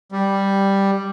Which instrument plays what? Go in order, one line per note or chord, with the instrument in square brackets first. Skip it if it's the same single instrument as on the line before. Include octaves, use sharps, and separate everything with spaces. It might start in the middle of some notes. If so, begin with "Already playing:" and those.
[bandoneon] G3